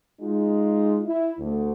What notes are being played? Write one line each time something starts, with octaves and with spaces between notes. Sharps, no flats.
G#3 D#4 F4
E4
D2